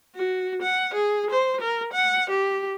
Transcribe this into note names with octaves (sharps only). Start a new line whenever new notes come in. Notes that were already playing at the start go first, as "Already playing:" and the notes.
F#4
F#5
G#4
C5
A#4
F#5
G4